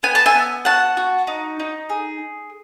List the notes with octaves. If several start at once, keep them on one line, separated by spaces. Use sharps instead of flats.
B3 G#5
A5
E5 G#5
B3
F#4 F#5 A5
F#4
D#4
D#4
G#4